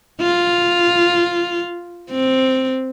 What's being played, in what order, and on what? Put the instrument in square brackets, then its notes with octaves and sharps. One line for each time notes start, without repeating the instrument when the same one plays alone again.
[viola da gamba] F4
C4